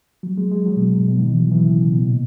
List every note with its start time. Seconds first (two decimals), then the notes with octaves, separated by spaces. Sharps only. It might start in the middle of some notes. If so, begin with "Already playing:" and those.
0.23 F#3
0.38 G#3
0.51 G#3
0.66 F#3
0.77 B2
0.98 G#2
1.08 B2
1.19 D#3
1.30 E3
1.40 F#3
1.51 E3
1.65 C#3
1.80 C#3
1.93 B2
2.04 A#2